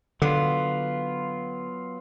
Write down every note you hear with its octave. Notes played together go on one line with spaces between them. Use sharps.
D3 F#3 B3 F4